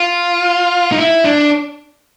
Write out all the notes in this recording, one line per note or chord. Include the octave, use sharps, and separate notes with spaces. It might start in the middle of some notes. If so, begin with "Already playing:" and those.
Already playing: F4
D#4
E4
D4